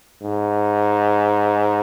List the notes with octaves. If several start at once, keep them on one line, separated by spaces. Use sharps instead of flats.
G#2